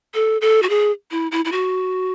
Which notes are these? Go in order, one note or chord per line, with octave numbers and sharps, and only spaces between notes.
A4
A4
F#4
G#4
E4
E4
E4
F#4